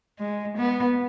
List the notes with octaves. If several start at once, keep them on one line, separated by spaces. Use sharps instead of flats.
G#3
B3